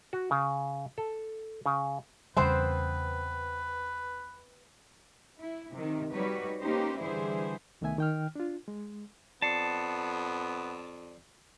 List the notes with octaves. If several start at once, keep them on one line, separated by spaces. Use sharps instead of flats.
F#4
C#3
A4
C#3
E2 C#3 G3 B3 C4 B4 C5
E4
C3 D#3
G3 D#4 F#4 B4 C#5
A#3 C#4 D#4 G4 B4 C5
D3 E3 G3 E4 G#4 C5
C2 D#3 A3 B3 E5 G#5
D#3 G5 F6
D4 F4
G#3
F2 B3 D5 A5 C7 C#7